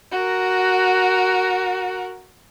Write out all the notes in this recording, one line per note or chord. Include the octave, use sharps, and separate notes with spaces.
F#4 A#4